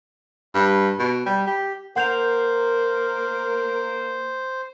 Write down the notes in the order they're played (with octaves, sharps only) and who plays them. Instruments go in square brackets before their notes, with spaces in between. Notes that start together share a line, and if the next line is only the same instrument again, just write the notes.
[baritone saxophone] G2
B2
G3
G4
[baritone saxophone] A#3 [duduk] A#4 [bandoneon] C5 [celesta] F#5 G6 F7